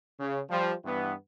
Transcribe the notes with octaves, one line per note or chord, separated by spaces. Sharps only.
C#3
F3 G3
G2 E3 B3